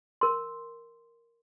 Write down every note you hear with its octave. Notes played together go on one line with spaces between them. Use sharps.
A#4 C6